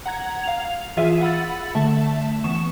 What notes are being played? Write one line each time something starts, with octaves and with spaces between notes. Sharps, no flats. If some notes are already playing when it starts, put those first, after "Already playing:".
F#5 A#5 G#6
F5 F7
E3 F4 G#4 E5 F5 D#7
F#5 B5 E6 A6
D3 A3 E5 A5
E3 B3 C#6 E7